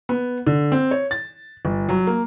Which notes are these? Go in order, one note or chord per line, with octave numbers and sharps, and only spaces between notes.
B3
D3
C4
C#5
A6
G1
F#3
A#3